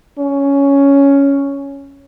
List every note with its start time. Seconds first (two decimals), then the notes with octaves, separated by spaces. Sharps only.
0.18 C#4